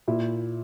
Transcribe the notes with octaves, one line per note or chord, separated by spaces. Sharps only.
A#2 E4